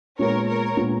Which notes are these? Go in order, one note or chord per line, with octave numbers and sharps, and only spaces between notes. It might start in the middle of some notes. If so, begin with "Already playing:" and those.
A#2 G#3 B3 A#4 C#5
A#4 C#5
A#2 G#3 B3